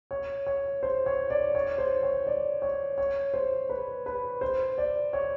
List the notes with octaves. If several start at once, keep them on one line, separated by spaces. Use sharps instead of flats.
C#5
C#5
C5
C#5
D5
C#5
C5
C#5
D5
C#5
C#5
C5
B4
B4
C5
D5
C#5